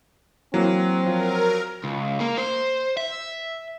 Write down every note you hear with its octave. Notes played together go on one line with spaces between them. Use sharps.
E3 F#3 A#3 C4
F3 A#4
C#2
A#3
C5
E5